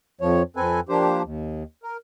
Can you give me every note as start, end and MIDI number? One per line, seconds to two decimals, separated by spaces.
0.21 0.43 41
0.21 0.43 53
0.21 0.43 73
0.56 0.80 41
0.56 0.80 60
0.56 0.80 69
0.56 0.80 71
0.56 0.80 80
0.89 1.22 53
0.89 1.22 58
0.89 1.22 62
0.89 1.22 67
0.89 1.22 72
1.23 1.63 39
1.83 1.97 70